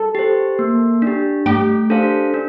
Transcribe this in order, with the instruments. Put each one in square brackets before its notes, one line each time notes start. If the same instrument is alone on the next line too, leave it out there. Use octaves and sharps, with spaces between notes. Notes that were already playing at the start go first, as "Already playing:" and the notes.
Already playing: [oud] A4
[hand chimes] G4 C5
A#3
D4 G4
[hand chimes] A3 [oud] G4
[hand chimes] D4 A4 C5 F5
D4